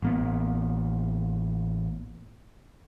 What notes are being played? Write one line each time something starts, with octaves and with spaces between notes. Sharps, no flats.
A1 A#3 B3